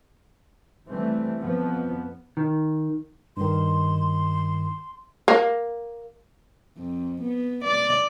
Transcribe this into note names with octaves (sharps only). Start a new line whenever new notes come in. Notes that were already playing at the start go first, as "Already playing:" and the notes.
E3 G3 A3 C4
F2 F3 B3
D#3
G2 D#3 C6
A#3
F2
B3
D5